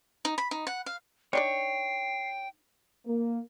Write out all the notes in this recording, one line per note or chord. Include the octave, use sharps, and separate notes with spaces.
D#4
B5
D#4
F#5
F5
D4 D#4 C#5 D5 G5 C7
A#3